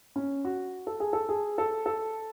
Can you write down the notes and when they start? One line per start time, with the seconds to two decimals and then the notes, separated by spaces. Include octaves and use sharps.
0.16 C#4
0.45 F#4
0.87 A4
1.00 G#4
1.13 A4
1.29 G#4
1.58 A4
1.86 A4